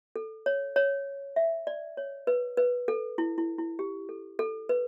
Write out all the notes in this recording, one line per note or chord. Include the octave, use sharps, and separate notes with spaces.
A4
C#5
C#5
E5
D5
C#5
B4
B4
A4
E4
E4
E4
G4
A4
A4
B4